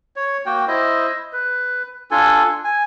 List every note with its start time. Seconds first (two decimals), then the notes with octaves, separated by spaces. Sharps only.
0.16 C#5
0.46 A#3 F#4 G5
0.67 E4 C5 D#5
1.33 B4
2.11 D4 F4 A4 G#5
2.64 G#5